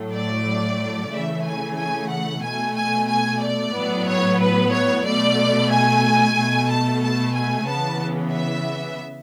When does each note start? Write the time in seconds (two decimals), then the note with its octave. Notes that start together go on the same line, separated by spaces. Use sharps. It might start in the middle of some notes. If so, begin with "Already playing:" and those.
Already playing: A2 F#3 A3
0.13 D5
1.11 C#3 E3 A3 E5
1.45 G#5
1.77 G#5
2.09 F#5
2.43 B2 A3 G#5
2.76 G#5
3.08 G#5
3.41 D5
3.74 A2 F#3 B3
4.07 C#5
4.40 B4
4.72 C#5
5.05 B2 A3 D5
5.70 G#5
6.36 B2 A3
6.69 A5
7.02 A5
7.34 G#5
7.68 C#3 E3 B3 A5
8.33 E5